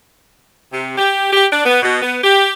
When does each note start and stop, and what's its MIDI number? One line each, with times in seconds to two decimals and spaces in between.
0.72 0.94 48
0.96 1.31 67
1.33 1.46 67
1.52 1.61 62
1.65 1.79 59
1.82 2.00 47
2.01 2.17 59
2.23 2.53 67